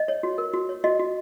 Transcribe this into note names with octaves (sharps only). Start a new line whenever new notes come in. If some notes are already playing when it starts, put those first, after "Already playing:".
Already playing: D#5
C#5
F#4
A#4
F#4
C#5
F#4 D#5
F#4